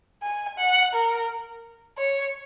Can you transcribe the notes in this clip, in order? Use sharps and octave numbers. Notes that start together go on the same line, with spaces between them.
G#5
F#5
A#4
C#5